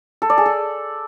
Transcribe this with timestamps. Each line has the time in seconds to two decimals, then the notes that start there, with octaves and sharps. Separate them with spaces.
0.22 A4
0.30 D5
0.38 G#4
0.46 A4